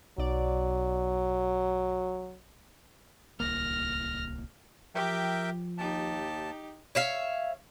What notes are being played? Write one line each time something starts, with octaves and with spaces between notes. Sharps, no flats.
B1 F#3 D5
D1 C2 A#3 F6 A#6
F3 G4 A#4 E5 G5
D#2 D#4 G4 A5
C#5 E5 F5